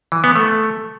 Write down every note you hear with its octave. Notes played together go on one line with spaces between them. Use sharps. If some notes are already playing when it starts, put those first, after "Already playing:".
E3
B3
A3